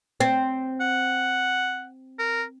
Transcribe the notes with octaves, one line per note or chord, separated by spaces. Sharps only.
C4
F#5
A#4